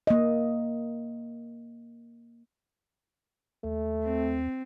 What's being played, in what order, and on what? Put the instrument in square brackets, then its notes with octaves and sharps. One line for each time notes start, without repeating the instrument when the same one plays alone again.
[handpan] A#3 D#5
[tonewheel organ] D#2 [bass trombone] A3
[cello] C4